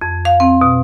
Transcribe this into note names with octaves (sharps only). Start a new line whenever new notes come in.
F2
F5
C4
B2